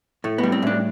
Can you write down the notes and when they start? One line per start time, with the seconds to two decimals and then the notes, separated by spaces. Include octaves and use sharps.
0.24 A2 A3
0.38 B3
0.43 G3
0.52 C4
0.62 A2 D4